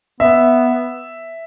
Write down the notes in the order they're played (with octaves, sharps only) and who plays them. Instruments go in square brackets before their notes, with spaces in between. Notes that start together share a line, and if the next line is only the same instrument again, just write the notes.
[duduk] B3 [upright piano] E5